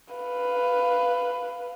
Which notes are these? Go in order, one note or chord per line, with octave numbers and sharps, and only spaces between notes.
B4 F5